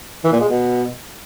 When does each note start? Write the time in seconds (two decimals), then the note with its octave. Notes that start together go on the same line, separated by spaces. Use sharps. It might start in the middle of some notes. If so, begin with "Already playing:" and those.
0.24 E3
0.32 A#2
0.40 G#3
0.48 B2